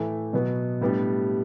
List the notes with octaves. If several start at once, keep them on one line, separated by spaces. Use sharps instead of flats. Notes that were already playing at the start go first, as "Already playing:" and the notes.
Already playing: A2 E3 A3
B2 F#3 B3
A2 G3 B3 D4 G4